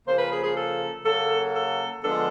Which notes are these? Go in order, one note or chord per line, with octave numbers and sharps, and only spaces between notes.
C#3 F3 A#3 C5
B4
G#4
G#4
A4
C#3 F#3 A#3 A4
A4
D3 F3 G#3 B3 D4 A4